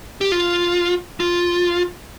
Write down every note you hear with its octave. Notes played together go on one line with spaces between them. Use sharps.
G4
F4
F4